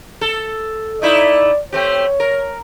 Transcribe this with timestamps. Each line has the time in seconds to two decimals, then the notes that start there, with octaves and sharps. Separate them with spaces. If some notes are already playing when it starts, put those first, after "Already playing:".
0.21 A4
1.02 A3 D#4 E4 D5
1.73 A3 C4 G4 C#5
2.20 A#4